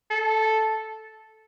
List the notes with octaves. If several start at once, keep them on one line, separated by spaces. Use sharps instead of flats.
A4